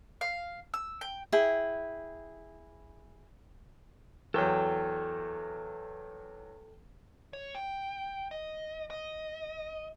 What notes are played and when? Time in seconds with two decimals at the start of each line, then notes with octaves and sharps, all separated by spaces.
0.21 F5
0.74 E6
1.01 G5
1.32 E4 G#4 G5
4.34 E2 F#3 A4 G5
7.33 C#5
7.55 G5
8.31 D#5
8.90 D#5